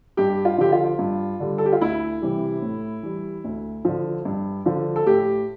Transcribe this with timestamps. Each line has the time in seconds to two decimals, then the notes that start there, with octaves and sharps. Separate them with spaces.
0.17 G2 G4
0.45 F4
0.58 D3 F3 G4
0.72 F4
0.99 G2
1.40 D3 G3
1.58 A4
1.66 G4
1.73 F4
1.81 D2 E4
2.22 C3 E3 G3
2.62 A2
3.03 E3 G3
3.44 D2
3.85 D3 F3
4.25 G2
4.65 D3 F3
4.96 A4
5.07 A2 G4